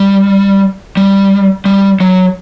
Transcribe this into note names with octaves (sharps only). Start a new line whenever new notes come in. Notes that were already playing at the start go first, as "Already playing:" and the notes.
Already playing: G3
G3
G3
F#3